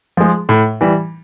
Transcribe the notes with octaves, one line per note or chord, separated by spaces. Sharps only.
F3 G#3
A2
E3 G3